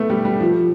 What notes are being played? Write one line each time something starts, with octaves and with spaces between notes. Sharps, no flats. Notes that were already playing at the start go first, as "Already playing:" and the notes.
Already playing: A3 B3
G3
G3
F3